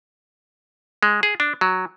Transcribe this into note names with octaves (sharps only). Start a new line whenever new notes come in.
G#3
G#4
D4
F#3